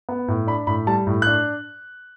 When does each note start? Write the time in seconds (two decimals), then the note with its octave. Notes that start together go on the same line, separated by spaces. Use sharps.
0.09 B3
0.28 A2
0.47 D4 B5
0.67 A2 B5
0.87 G3 A5
1.07 A2
1.22 F#6
1.27 D4